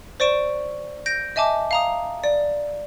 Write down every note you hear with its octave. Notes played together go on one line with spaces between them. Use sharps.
C5 D5 C#6 D7 E7
G6 A#6 D7
D#5 E5 G#5 A5 D6
F5 A#5 D#6
D5